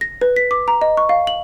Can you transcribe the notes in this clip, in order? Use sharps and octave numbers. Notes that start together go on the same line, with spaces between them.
A#6
B4
B6
D6
A#5
D#5
C#6
F5
F#7